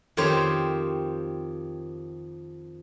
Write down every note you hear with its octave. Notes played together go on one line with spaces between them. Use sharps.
F2 D#3 G4 C5 C#5